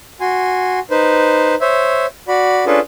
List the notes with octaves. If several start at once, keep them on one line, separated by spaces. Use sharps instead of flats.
F#4 G#5 C6
D#4 B4 C5
C5 C#5 E5
F#4 D5 B5
C#4 D4 F4 G#4 A4 B4